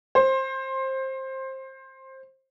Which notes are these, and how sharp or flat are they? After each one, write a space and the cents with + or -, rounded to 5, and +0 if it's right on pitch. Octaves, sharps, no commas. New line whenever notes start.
C5 +20